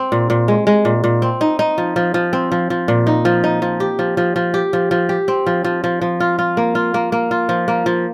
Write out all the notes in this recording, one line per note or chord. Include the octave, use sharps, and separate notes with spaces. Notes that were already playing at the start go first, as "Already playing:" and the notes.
Already playing: C4
A#2
A#2
G#3
G#3
A#2
A#2
C4
D#4
D#4
F3
F3
F3
C4
F3
F3
A#2
D#4
F3
D#4
F3
G4
F3
F3
F3
G4
F3
F3
G4
C4
F3
F3
F3
F3
F4
F4
A#3
F4
A#3
A#3
F4
F3
A#3
F3